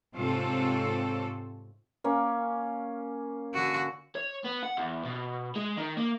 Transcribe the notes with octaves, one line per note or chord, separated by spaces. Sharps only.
G#2 C3 C4 F4 A4 C#5
A#3 C#4
D3 F#4
C#5
B3
F#5
E2
B2
G#3
D#3
A#3